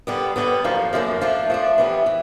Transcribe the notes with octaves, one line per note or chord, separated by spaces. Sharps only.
D3 G3 B3
D3 G3 B3
F#2 D3 F3 A#3
F#2 D3 F3 A#3
F3 A3 D4
F3 A3 D4
E3 G3 B3
E3